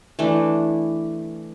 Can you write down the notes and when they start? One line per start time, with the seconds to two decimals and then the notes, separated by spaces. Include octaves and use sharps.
0.19 E3 A3 D4